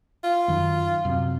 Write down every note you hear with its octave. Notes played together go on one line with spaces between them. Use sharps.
F4
F#2 D#3
F#2 C3